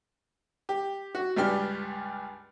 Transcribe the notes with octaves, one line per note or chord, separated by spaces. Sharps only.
G4
F#4
C#2 G2 D4 G4 F6